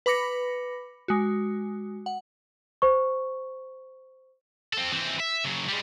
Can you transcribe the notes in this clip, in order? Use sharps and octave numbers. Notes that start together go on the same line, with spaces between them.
B4 B5 D6 A#6 C#7
G#3 F#4
F#5
C5 C#6
C4 A4
E3 C4
E5
C#3 F#3
G3 G#3